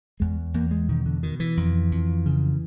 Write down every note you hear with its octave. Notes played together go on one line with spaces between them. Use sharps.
E2 G#3
E2 A#3
G#3
B2 D#3
D3
B2 D#3
E3
F2
F2
C#3